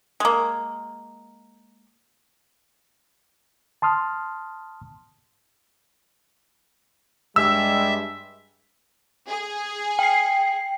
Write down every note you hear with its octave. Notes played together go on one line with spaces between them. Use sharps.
G#3 A#3
A5 C6 D#6 F6
G2 G3 G#3 E5 E6
G#4
G5 C7